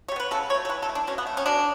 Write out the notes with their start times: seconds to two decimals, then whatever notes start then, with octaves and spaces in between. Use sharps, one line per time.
0.08 G3 C#5
0.16 B3 B4
0.31 C#3 A4
0.50 F#3 C#5
0.54 A3
0.65 A4
0.69 E3 B4
0.82 A4
0.89 A3
0.95 D4
1.07 B2 C#4
1.18 B3
1.27 A3
1.37 C#4
1.46 B2 D4